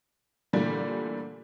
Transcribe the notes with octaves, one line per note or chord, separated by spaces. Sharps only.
A#2 D3 E3 G3 A3 A#3